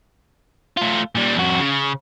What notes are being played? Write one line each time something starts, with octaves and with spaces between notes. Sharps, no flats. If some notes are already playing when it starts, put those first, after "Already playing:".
A3 F4
A#2 G3
F2 F#4
C#3